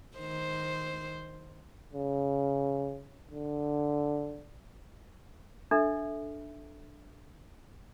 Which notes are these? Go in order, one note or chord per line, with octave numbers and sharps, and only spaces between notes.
D#3 C5
C#3
D3
D4 A4 E5